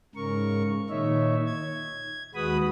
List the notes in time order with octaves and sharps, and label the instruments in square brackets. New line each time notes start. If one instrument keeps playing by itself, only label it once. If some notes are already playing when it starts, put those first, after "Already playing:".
[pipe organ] G#2 C#3 A#4 C#6
A#2 D#3 D#4 C#5 E5
G#6
D#2 G#3 F#4 B4 B5 D#6